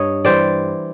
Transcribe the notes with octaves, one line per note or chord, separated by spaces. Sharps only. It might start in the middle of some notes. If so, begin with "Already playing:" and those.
Already playing: G2 C#5 D#5
E3 G3 C5 D5